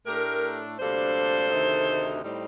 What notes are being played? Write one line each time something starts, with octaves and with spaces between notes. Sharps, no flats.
A2 A3 D4 G4 A#4
D2 C3 G3 A#3 D4 A4 C5
D2 C3 D#3 A3 D#4
A2 G3 C4 D#4